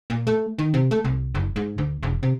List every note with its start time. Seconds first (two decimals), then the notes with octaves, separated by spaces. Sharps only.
0.10 A#2
0.27 A3
0.59 D#3
0.74 C3
0.91 A3
1.04 C2
1.35 F#1
1.56 G#2
1.78 D2
2.03 E1
2.23 C3